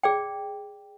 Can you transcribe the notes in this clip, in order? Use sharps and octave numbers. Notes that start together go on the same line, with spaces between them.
G#4 D5 G5